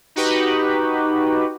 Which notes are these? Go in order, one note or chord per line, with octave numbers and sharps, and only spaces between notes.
D#4 F#4 G4 B4